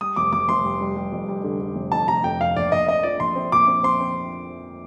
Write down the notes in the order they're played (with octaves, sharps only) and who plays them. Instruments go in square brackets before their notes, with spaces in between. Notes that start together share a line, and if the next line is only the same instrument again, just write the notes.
[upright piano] G3 [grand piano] D#6
[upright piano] F1 [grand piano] D6
[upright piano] F1 [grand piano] D6
[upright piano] F1 [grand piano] C6
[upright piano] G3
G3
G3
F2
G3
D3
D3
F1
[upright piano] F2 [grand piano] A5
[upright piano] F1 [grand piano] A#5
[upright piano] F2 [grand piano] G5
[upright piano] F2 [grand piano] F5
[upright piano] A#1 [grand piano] D5
[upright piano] A#1 [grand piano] D#5
[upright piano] C4 [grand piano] D#5
[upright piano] F3 [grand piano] D5
[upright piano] A#1 [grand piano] C6
[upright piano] C4
[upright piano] A#2 [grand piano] D6
[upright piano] C4
[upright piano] C4 [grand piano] C6
[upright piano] C4